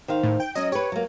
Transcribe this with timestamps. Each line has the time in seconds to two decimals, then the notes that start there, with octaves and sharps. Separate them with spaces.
0.08 D#3 C5 F5
0.23 A2
0.40 G5
0.55 F#3 C#4 D#5
0.72 G4 B4 C#5
0.92 F#3 A#3